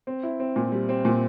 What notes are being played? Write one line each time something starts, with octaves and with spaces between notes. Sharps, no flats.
C4
E4
C4
A#2
G3
C4
A#2